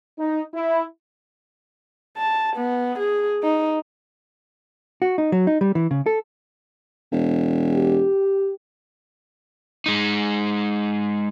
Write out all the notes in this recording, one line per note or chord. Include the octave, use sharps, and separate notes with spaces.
D#4
E4
A5
B3
G#4
D#4
F#4
D#4
F#3
D#4
G3
E3
C#3
A4
E1
G4
G#3 D#4